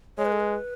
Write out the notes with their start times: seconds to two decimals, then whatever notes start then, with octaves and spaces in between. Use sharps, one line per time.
0.18 G#3 C#5
0.25 B4
0.32 A4
0.40 B4